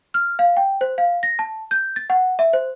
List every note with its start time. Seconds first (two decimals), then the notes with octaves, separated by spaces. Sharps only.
0.14 F6
0.39 F5
0.57 G5
0.81 C5
0.98 F5
1.23 A#6
1.39 A5
1.71 G6
1.96 A6
2.10 F#5
2.39 E5
2.53 C5